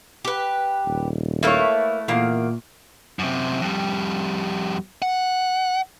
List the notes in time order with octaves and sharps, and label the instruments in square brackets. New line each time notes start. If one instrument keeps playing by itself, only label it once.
[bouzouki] G4 B4
[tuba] D#1
[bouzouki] A3 E4 B4 [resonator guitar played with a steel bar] A#3 C#5
[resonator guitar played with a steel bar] E2 A#3 F5 [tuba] A#2
[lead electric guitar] F#2 C3
F2 G3
F#5